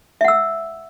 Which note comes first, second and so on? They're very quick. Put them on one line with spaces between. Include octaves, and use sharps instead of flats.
E5 F#5 E6